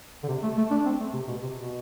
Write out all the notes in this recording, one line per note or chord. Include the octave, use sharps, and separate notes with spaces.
D3
C3
A3
A3
D4
C4
A3
C3
B2
C3
B2